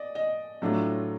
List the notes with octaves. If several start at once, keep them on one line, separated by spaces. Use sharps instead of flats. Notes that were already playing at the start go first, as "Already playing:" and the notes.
Already playing: D5 D#5
D#5
A2 F#3 A3 D4 F4